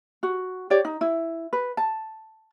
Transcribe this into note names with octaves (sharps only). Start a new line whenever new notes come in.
F#4
G4 C#5 D5
D#4
E4
B4
A5